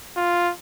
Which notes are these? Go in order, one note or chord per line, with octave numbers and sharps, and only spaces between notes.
F4